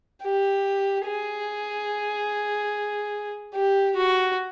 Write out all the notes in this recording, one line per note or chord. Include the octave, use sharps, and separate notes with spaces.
G4
G#4
G4
F#4